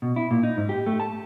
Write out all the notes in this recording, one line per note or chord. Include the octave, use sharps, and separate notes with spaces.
B2
E4
A#2
D#4
G#2
G4
A3
A5